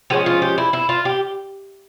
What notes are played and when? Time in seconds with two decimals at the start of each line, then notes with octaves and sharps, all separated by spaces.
0.10 F3 G#3 C#4 G4
0.26 F4
0.42 G4
0.58 E4
0.73 E4
0.89 F4
1.05 G4